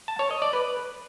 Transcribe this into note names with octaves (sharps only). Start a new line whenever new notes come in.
A5
C#5
D#5
D5
B4